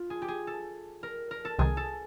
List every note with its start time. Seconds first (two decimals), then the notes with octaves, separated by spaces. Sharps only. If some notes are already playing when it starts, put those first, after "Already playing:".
Already playing: F4
0.10 G#4
0.22 G4
0.28 G#4
0.47 A4
1.03 A#4
1.31 A#4
1.45 A4
1.59 C2 C3 D#3 G#4
1.77 A4